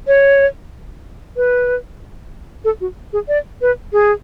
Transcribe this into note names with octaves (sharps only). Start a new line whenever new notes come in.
C#5
B4
A4
F#4
G#4
D5
B4
G#4